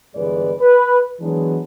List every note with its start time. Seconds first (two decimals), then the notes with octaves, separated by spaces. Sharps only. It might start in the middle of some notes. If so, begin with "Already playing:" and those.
0.15 G1 E3 G#3 B4 D5
0.61 B4
1.20 E3 F#3 G#3 B3 D4